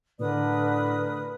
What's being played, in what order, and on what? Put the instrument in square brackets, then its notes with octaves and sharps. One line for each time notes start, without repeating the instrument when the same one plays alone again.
[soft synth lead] A2 [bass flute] D3 [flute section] A#4 B4 D#6 [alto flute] D5